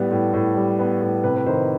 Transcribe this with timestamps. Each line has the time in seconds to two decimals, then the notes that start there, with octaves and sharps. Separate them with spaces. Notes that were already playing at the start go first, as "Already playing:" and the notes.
Already playing: A2 G3 B3
0.11 A2
0.33 A2
0.56 G3
0.79 B3
1.01 A2
1.24 C3 B4
1.36 B4
1.46 D#3 C5